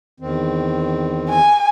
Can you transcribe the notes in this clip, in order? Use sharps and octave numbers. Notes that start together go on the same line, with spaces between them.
E2 D#3 C4
G#5